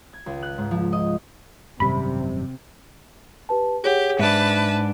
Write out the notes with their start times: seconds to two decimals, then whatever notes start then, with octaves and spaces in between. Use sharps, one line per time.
0.13 G#6
0.26 C#2
0.43 F#6
0.58 G#2
0.71 F3
0.93 D#5
1.80 G#1 F#2 C3 G3 B5
3.49 G4 B4 A5
3.84 G4 G#4 C#5 F#5
4.19 G#2 D4 B4 E5 A5